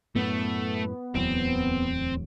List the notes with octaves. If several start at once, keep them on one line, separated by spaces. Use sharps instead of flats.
F#2 A2 A3 B3
D1 E2 F#3 C4